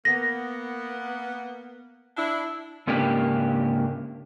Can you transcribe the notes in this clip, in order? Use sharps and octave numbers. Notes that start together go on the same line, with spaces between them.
A#3 B3 A#6
D4 E4
G#2 C#3 A#3 D4 G4 B4